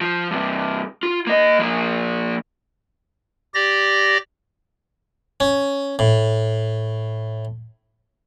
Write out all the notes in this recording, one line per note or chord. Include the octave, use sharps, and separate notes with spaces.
F3
G2 C3
F4
A#3 D#5
F3 A#3
G4 D5 A#6
C#4
A2